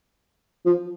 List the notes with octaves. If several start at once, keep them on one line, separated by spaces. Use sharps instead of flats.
F3